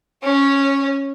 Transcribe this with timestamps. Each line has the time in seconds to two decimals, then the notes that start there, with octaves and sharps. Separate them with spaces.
0.23 C#4 C#5